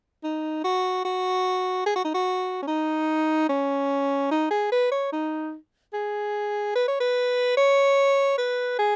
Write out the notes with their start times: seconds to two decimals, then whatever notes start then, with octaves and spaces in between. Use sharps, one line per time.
0.24 D#4
0.64 F#4
1.05 F#4
1.86 G#4
1.96 F#4
2.05 D#4
2.14 F#4
2.62 C#4
2.67 D#4
3.49 C#4
4.31 D#4
4.51 G#4
4.72 B4
4.92 C#5
5.13 D#4
5.94 G#4
6.75 B4
6.88 C#5
7.00 B4
7.57 C#5
8.38 B4
8.79 G#4